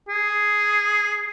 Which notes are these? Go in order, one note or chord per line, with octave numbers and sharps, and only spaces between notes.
G#4